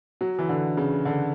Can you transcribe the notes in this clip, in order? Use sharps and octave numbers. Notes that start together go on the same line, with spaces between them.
F#3
E3
D3
C#3
D3